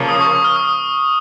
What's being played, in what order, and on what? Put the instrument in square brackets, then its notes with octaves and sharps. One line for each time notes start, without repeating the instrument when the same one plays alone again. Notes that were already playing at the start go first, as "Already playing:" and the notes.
Already playing: [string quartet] C#3 F3 A#3
[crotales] D#6
C#6
D#6
F6
D#6